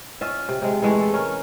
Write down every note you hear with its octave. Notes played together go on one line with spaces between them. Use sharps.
C#4 F4 D#5 E5
C3
C3 G#3
E3 G#3 A3
A4
C#4 A#4